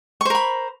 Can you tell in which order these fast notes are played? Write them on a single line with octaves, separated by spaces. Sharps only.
C#6 C5 A#4 B5